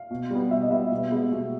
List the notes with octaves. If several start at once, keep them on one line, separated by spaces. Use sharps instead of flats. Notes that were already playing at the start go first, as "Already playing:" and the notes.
Already playing: F5
B2
G3 B3
B2 E5
D#5
G3 B3 E5
B2
G#3 B3
B2